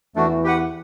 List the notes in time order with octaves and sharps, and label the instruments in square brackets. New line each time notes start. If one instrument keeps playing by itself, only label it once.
[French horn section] E2 E3 [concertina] A3 D4 F#4
[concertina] G4 B4 F#5